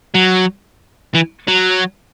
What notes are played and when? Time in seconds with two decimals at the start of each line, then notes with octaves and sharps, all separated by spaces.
0.15 F#3
1.15 E3
1.48 F#3